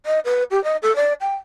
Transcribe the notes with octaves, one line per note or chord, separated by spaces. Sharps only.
D#5
B4
G4
D#5
A4
D5
G5